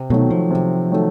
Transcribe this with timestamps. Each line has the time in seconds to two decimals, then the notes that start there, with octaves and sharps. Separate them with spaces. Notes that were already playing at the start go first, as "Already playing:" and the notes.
Already playing: C3
0.10 B2 D#3 F#3 A3
0.30 F3
0.51 C3
0.91 D#3 F#3 A3